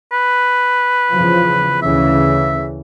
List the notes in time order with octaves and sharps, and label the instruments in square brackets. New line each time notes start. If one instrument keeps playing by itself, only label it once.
[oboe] B4
[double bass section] E2 C#3 F3
[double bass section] D2 C#3 E3 [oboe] E5